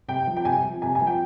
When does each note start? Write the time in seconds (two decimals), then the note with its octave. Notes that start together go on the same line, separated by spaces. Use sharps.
0.08 C3 G5
0.27 F3
0.37 G5
0.45 C3 G#5
0.64 F3
0.82 C3 G#5
0.95 G#5
1.01 F3
1.07 G5